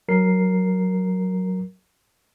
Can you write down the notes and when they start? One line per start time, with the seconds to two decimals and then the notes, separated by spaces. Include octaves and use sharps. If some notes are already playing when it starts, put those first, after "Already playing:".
0.08 F#3 A#4 C7